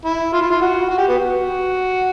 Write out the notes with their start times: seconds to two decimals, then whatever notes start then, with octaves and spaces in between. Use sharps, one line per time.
0.05 E4
0.33 F4
0.41 E4
0.50 F4
0.61 F#4
0.89 F#4
0.98 G4
1.08 B3 F#4